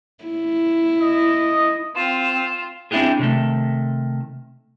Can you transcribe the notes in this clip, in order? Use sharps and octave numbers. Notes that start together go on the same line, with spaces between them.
E4
D#5
C4 F4 E7
C4 D4 E4 F4 G4 G#4
C3 D#3 A3